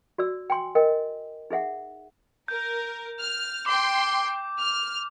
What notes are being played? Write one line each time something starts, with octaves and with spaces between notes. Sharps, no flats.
F#4 D5 E6
G5 G#5 C6
A#4 D#5 G5
D#4 G#4 E5 F#5
A#4 G6
F6
G5 C6 D6
F6